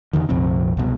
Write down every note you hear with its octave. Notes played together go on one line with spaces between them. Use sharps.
E2 D3 D#3
A#1 F2 C3 C4
C2 B2